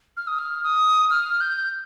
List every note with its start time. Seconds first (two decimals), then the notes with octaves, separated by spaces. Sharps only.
0.17 F6
0.27 D#6
0.38 F6
0.64 D#6
1.10 F6
1.41 G6